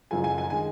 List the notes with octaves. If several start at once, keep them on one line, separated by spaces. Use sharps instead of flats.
F#1 F#2 F3 G#3 G#5
G#5
G#5
D#3 G#3 G#5